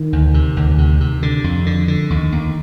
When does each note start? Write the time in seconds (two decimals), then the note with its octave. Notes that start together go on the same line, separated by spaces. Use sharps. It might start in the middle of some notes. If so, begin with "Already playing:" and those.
Already playing: D#3
0.13 D2
0.34 C3
0.57 D2
0.78 C3
1.00 C3
1.22 D3
1.44 F2
1.66 D3
1.88 D3
2.10 D#2
2.32 D#2